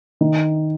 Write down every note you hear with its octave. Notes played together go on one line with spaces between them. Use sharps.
D#3